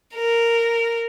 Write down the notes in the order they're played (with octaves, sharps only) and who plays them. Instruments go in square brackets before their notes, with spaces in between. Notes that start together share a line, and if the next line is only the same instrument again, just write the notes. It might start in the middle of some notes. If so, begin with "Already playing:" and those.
[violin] A#4